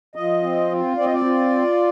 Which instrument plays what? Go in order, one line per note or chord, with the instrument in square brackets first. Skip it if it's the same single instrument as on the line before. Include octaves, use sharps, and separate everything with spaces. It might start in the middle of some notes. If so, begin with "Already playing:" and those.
[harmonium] F3 D#5
C4
F4
C4 D5
D#5
D5
F4